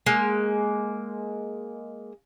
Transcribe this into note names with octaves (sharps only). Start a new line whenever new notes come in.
G#3 A#3